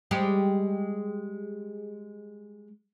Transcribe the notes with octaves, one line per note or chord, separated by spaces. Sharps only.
G3 G#3 G4